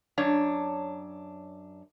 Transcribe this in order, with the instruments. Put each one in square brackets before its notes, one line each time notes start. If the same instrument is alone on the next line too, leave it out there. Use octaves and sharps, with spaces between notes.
[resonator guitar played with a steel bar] F#2 D4 C#5